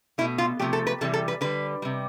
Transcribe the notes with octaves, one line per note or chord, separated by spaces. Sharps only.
B2 A3 E4
F4
C3 F3 A3 G4
A4
B4
C3 E3 G3 A4
A4
B4
D3 G3 B4
C3 G3